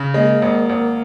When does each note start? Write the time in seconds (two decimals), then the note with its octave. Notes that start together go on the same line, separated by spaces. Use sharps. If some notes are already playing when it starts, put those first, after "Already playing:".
Already playing: C#3
0.14 G#3 A#3
0.42 G#1
0.69 G#1